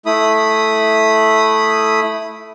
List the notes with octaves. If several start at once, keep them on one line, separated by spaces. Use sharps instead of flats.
A3 E4 B5 D#6